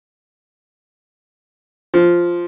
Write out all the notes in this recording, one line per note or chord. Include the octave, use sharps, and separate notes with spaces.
F3